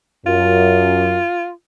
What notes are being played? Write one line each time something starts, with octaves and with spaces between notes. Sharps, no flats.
F#2 F4